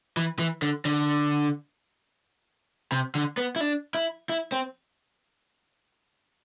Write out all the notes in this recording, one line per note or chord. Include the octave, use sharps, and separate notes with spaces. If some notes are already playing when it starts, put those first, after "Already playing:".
E3
E3
D3
D3
C3
D3
B3
E4
D4
E4
E4
C4